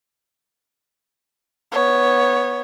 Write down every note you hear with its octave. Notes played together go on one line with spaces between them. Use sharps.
B3 C#5